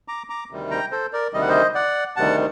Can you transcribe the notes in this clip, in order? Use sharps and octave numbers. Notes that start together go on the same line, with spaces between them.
A#5 D6
A#5 D6
D2 C3 D#3 G3
G5 A#5
A4 C5
A#4 D5
D2 C3 D#3 G3 D#5
F#5
C5 D#5
D5 F#5
D2 C3 D#3 G3 F#5 A5